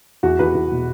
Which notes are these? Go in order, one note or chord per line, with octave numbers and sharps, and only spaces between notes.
E2 F#4
E2 B4
E2
B2